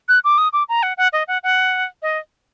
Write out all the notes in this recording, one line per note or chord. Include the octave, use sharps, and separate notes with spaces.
F#6
D6
D#6
D6
A#5
F#5
F#5
D#5
F#5
F#5
D#5